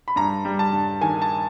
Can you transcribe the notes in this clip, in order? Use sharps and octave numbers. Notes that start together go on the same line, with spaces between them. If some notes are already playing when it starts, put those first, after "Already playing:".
B5
G2 A#5
G3
A5
G2
D#3 G#5
A5